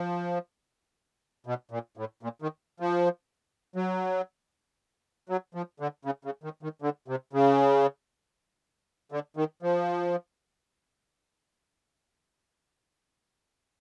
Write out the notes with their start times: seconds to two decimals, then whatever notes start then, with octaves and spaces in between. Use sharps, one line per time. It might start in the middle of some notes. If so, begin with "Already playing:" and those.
Already playing: F3
1.46 B2
1.71 A#2
1.97 A2
2.23 A#2
2.42 D#3
2.80 F3
3.76 F#3
5.29 F#3
5.55 F3
5.80 D3
6.05 C#3
6.25 C#3
6.44 D#3
6.63 D#3
6.82 D3
7.08 C3
7.33 C#3
9.12 D3
9.37 D#3
9.63 F3